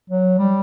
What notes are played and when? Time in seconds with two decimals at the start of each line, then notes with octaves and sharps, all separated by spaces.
0.10 F#3
0.38 G3